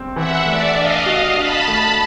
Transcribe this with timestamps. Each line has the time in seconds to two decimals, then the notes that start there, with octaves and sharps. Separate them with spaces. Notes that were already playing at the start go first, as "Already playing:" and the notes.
Already playing: G2 C4
0.15 E3 E5 F#5
0.46 A3 D5 E5
0.76 D4 D#5 F5
1.06 F#4
1.36 D4 A5 B5
1.68 A3